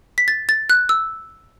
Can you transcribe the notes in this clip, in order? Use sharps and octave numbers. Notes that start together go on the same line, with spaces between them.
B6
A6
A6
F#6
E6